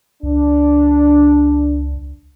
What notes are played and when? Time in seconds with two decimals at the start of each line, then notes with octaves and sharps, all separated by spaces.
0.23 C#2 D4